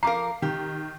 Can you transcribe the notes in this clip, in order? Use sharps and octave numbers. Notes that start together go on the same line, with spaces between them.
F3 A#4 F5 A#5 D6 C7
D#3 G4